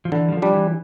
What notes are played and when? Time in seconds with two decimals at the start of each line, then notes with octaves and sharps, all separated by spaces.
0.05 F3
0.12 D3 E3
0.28 G3
0.32 F3
0.42 G3 D4
0.53 E3